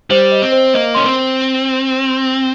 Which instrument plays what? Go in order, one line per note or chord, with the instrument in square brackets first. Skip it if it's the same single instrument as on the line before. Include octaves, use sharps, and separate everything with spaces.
[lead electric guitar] G3 [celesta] C5
[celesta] D#5
[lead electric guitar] C4
[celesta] C5
[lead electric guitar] A#3 [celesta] D#5
[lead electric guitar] C#4 [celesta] C6
[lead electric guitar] C4